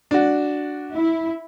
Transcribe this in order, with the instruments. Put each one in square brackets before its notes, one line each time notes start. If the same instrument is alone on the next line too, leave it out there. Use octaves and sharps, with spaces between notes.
[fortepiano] D4 F#4
[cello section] E4